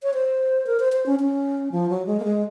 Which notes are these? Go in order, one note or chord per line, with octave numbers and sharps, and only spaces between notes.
C#5
C5
A#4
C5
C5
C#4
C#4
F3
F#3
G#3
A#3
G#3